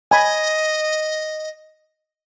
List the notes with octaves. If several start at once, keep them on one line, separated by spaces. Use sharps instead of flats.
D#5 G#5 B5